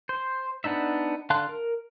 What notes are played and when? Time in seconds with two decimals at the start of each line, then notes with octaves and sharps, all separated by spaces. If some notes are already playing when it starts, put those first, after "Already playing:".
0.09 C5
0.64 B3 D4 D#4 E5
1.30 D3 F5 A5 C6 F#6
1.49 A#4